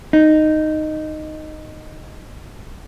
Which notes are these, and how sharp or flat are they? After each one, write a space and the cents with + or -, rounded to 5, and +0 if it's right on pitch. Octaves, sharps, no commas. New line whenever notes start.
D#4 -10